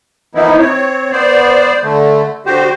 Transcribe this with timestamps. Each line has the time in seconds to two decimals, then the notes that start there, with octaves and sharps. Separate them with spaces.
0.35 E3 F3 A#3 B3 D#4 E4
0.59 C4 C#5
1.11 B3 C5 D5
1.83 D3 A3
2.46 D3 F#4 G4 C5